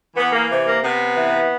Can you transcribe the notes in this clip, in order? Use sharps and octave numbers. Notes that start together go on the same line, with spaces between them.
E3 B3
A#3
C3
A#3
C3 B3
E3